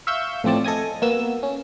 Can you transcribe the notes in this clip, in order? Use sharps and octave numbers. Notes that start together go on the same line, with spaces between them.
E5 F5 C#6 E6 G6
A2 F3 C4 D5 A5
A4 D#5 G#5 D#6
A#3 B3 F#4 E6
C#4